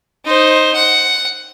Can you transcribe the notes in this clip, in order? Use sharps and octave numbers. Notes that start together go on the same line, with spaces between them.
D#4 C5
F#5